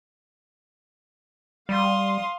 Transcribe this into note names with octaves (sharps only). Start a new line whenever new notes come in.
G3 F5 C6 D#6